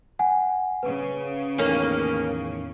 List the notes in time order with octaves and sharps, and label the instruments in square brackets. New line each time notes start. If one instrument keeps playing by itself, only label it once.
[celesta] F#5 G#5
[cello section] C#3 [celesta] B4
[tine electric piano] E2 A2 D#3 [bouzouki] A#3 C#4